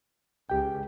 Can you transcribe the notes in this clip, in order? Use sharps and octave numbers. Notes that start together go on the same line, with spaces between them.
C#2 G4 G5